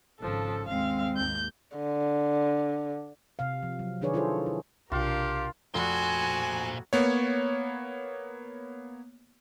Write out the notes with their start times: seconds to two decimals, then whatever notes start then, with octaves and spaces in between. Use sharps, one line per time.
0.20 G#1 G#2 C#3 F3 A4
0.68 D#2 G#3 C4 F5
1.17 G#1 D#2 A#3 G6
1.77 D3
3.39 C3 F5
3.63 F3
3.79 F#3
4.01 D#3 D4 G#4 B4 C#5 D5
4.14 E4 F4 G#4 A4 C5
4.46 E4
4.92 B1 C3 D4 F4 G4 A#4 F5
5.74 F1 A#2 F#4 C5 G#5
6.93 A#3 B3 C#5